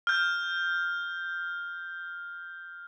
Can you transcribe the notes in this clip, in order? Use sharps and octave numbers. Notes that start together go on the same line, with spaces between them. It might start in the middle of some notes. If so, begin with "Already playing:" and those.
F6 G6